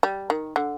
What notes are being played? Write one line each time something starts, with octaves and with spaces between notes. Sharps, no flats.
G3
D#3
D3